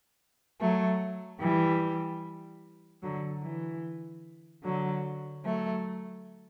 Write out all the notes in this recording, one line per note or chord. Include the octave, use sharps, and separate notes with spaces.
F#3 A3
E3 G3
D3 F#3
E3
D3 F#3
F#3 A3